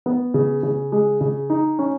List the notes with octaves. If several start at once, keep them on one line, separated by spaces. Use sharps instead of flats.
B3
C#3
C#3
G#3
C#3
D#4
C#4